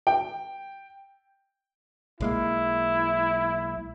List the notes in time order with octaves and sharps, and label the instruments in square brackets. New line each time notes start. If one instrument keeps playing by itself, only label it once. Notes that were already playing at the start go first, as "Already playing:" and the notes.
[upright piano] G5
[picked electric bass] B1 G#3 A#3 [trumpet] E4